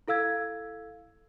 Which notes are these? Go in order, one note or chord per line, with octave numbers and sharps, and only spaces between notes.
E4 A4 F5 E6 G#6